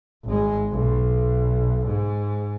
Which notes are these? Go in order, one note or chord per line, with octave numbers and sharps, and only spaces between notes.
G#1 G#3
B1
G#2